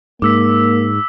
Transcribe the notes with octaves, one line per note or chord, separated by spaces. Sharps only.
G#2 A#3 D6 E6 B6